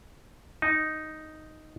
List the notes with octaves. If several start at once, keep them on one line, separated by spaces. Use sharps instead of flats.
D#4